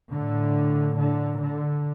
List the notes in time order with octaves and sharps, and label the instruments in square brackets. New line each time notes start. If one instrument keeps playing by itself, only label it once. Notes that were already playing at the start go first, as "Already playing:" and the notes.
[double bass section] A2 D3
D3
D3